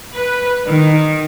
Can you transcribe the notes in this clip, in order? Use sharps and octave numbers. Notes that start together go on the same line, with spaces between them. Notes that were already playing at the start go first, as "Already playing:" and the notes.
B4
D#3